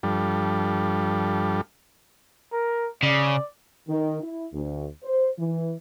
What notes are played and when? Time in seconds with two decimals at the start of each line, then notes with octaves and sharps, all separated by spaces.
0.03 G2 F3 G3 D4 A4
2.52 A#4
3.03 C#3 D5
3.89 D#3
4.23 E4
4.53 D2
5.04 C5
5.38 E3